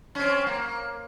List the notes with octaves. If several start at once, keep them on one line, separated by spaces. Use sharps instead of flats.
C4 C#4
A#3